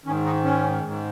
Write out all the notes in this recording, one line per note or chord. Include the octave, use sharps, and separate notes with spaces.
G#2 D#3 C#4
D#4
C#4
G#2 D#3